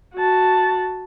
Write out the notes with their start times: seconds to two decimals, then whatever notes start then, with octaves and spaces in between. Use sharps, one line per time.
0.15 F#4 A5